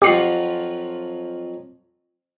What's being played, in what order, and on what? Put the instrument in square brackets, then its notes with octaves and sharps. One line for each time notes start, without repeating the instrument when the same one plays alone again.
[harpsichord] F2 F3 F#3 [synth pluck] G4 C7